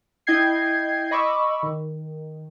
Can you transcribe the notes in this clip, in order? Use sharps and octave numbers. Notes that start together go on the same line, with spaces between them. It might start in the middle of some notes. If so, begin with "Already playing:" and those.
E4 D#5 G5 G6 G#6 C7
D#5 B5 C#6 D6 E6
D#3